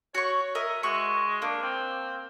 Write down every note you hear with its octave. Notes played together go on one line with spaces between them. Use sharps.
F#4 C#5 C#6
A#4 D#5 E5
G#3 F#4 C#6
A#3 D4
C4